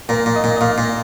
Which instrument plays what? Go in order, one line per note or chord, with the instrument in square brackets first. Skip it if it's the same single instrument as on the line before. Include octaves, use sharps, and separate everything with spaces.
[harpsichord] A#2 [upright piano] A#4
[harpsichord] A#2
[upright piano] D#5
[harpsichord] A#2
[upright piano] D#5
[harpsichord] A#2 [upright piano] F5
[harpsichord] A#2